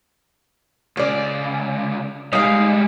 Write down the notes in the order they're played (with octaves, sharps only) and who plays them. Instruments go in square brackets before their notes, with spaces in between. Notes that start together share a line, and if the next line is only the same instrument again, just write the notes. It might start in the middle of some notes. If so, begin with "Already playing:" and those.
[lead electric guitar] C#2 C#3 [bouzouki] F4 D5
[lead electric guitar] G3 G#3 [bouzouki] D#4 F5